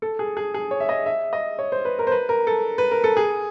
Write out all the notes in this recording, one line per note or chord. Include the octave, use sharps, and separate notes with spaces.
A4
G#4
G#4
G#4
C#5
E5
D#5
E5
D#5
C#5
C5
B4
A#4
C5
B4
A#4
A4
B4
A#4
A4
G#4